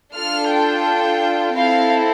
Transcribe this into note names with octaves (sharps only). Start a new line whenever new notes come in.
D4 F4 A4 F6
G5
C4 E4 A4 F5